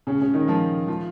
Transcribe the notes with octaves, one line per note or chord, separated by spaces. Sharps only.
C#3 C#4
C#3 C#4
D#3 D#4
F3 F4
F3 F4